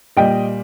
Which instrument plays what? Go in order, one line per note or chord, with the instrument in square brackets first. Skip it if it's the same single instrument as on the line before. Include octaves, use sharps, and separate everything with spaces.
[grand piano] A#2 G3 D#5 G5